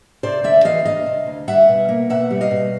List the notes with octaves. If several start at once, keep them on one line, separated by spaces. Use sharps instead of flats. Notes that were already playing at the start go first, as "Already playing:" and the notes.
C3 C5 D5
D2 D5 E5
E3 D#5 F5
D2 D#5 F5
C3
D2
G3 E5 F#5
B2
A#3
B2 E5 F#5
G3
D#5 F5
B2